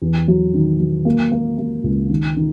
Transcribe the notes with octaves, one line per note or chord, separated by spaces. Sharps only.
E2
F#3
D#3
F#3
A#3
A#3
A#3
C#2
D#3
D#3